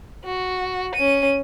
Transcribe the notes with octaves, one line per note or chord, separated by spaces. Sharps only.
F#4
C#4 D#7